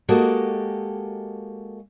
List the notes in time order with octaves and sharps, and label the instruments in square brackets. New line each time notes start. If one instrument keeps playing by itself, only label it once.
[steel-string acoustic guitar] G#3 A#3 F#4 G4 A4 D#5